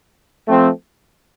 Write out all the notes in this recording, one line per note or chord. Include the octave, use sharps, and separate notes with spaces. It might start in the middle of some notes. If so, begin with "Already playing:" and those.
F3 A3 C4